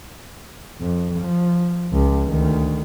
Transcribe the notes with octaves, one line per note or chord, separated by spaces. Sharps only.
F2
F3
C#2
D2 D#3